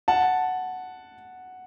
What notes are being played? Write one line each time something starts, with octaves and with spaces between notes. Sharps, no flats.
F#5 A5